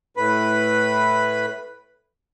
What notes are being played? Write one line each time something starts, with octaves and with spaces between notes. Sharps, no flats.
A2 B4 B5